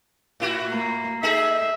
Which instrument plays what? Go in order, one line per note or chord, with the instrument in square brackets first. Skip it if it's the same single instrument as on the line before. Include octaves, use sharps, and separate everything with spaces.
[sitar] A2 E4 F#4
[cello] A#3
[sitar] D#4 G#4 A4 [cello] E5